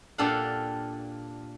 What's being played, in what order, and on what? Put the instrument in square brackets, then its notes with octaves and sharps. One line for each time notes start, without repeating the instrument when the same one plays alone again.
[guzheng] A#2 D4 G4 A4 F5 F#5